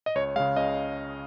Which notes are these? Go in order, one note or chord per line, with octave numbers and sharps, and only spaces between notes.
D#5
C#2 C#5
C#3 G#3 F5
C#2 D#5